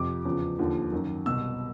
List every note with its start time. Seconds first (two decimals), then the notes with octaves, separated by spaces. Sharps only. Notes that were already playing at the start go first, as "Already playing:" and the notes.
Already playing: F2 C3 F3 D6
0.25 E2 C#3 F3
0.59 D#2 D3 F3
0.93 F#2 D#3
1.26 C2 B2 E6